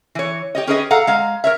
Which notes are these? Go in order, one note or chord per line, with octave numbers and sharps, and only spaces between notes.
E3 C#5
G4 C#5 D#5
C#4 G4 G#4 B4 C5 D#5
A4 F5 F#5 A#5
G#3 F5 A#5
A#4 C#5 E5